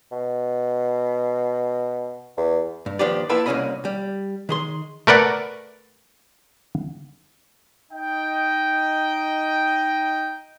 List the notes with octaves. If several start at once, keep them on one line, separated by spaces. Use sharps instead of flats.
B2
E2
G2
D#2 F3 D4 G4 B4 D5
A#3 E4 F4 A4 B4 G5
C2 A#2 G#3 C#4 D#5 B5
G3
D#3 G#4 C6
A3 A#4 B4 D5 F#5
D#4 D#5 G5